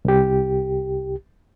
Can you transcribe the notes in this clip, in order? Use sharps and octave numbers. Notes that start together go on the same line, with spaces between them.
C2 G4